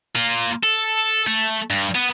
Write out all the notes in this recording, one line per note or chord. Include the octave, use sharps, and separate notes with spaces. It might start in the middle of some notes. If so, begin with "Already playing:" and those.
A#3 F4
A4
A3
G2
B3